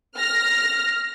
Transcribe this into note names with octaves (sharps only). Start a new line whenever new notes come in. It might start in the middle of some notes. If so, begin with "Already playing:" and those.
F6 A#6